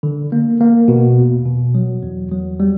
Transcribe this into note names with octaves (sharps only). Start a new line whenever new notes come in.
D3
A#3
A#3
B2
E2
B2
F#3
E2
F#3
G3